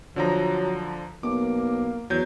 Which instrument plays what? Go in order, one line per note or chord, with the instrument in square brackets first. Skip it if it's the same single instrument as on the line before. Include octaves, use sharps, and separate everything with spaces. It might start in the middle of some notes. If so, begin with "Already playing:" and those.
[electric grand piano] D3 F3 A#5 [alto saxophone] F#3
[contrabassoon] B1 [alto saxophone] A#3 [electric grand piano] D6
[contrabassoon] E2 [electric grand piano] F#3 G6